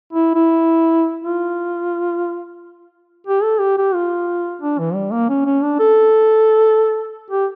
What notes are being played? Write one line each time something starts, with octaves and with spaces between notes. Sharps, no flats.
E4
E4
F4
G4
A4
G4
G4
F4
D4
E3
G3
A#3
C#4
C#4
D4
A4
G4